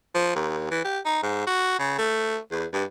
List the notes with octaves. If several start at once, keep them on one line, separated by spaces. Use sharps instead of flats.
F3
D#2
E3
G4
D#4
G#2
F#4
C#3
A3
E2
G2